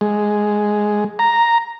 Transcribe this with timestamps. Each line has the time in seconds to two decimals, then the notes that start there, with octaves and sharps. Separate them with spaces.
0.01 G#3
1.19 A#5